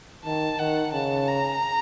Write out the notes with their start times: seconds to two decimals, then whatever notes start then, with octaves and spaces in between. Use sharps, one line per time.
0.25 D#3 A5
0.59 D#3 F#5
0.93 C#3 A5
1.28 A#5